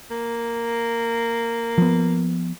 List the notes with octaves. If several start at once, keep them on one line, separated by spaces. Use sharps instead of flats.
A#3
F3 B3